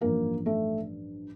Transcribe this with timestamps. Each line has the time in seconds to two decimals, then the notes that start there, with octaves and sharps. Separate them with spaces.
0.01 A1 G2 F3 A#3
0.46 A3